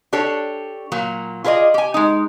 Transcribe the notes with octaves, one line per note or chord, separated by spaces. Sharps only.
D4 G4 A4 C#5
A#2 F#3 A#3
F4 G#4 B4 D5 D#5
G4 G#5
G#3 D#4